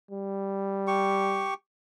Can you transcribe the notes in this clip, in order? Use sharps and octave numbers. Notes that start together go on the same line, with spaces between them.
G3
G4 C#6